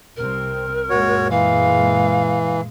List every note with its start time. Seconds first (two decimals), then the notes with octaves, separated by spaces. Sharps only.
0.16 C2 C3 C4 A#4
0.90 F#2 A#2 G#3 F#4 C#5
1.30 E3 F5